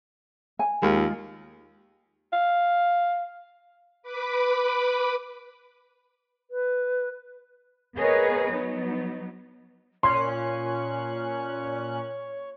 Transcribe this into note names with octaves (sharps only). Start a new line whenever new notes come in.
G#5
D#2 G#3 F4
F5
B4 B5 D6
B4
B3 G#4 A#4 B4 C#5 D#5
F#3 B3 D#4
A#2 C#4 C#5 C6 F#6